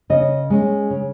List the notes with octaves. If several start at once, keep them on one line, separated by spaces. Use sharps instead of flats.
C#3 D#5
G#3 C#4
C#3